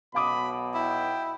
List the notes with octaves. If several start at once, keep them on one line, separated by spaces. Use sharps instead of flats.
B1 B2 F5 B5 D6 D#6
E4 G5